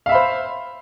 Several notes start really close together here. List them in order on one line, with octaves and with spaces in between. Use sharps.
F5 E5 B5 C5